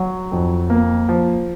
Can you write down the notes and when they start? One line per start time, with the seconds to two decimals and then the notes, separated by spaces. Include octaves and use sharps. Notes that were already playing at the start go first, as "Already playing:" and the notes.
Already playing: F#3
0.32 F2
0.70 A#3
1.09 F3